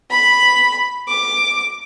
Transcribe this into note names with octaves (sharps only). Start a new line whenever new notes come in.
B5
D6